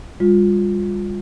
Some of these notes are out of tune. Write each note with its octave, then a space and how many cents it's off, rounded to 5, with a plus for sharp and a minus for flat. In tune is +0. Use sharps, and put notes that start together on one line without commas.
G3 +40 F4 +20